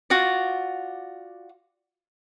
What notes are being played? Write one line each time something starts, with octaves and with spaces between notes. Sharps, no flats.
F4 F#4 D5